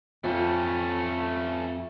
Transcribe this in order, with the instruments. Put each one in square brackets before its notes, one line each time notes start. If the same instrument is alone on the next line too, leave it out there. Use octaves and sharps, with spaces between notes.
[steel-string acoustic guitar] F2 [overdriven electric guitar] A3 C#4